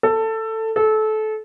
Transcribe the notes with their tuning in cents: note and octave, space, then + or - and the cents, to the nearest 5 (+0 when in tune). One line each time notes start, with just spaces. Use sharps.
A4 +15
A4 -25